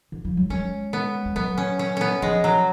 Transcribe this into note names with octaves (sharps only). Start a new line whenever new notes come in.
D3
F3
F#3
G#3 C#4
B3
G#3
F#3 B3
C#4
C#4
B3 C#4
F3 G#3
F#3